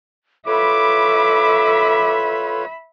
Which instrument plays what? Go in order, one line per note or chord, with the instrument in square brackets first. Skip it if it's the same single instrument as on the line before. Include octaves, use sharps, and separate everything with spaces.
[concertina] F4 B4 C#5 [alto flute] A4 [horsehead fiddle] E5 B5 [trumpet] D6